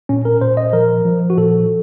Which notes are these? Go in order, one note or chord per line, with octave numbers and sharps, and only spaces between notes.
A#2 C#4
A#4
A#2 C5
D#5
F3 A#4
F3
F#4
A#2 A4